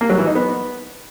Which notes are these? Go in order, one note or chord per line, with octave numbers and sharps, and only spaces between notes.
A#3
F#3
E3
D#4
B3